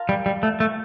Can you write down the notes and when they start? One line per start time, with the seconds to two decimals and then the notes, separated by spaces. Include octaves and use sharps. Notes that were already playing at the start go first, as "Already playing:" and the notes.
Already playing: F4 A#4 F5 A5
0.09 G3
0.26 G3
0.43 A3
0.60 A3